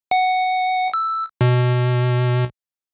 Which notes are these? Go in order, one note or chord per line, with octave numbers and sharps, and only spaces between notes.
F#5
E6
B2